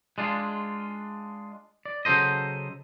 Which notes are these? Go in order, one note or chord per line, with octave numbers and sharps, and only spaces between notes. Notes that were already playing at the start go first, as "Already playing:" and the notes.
G#3 D4 F4
D5
C#3 F#3 A4 C5 D#5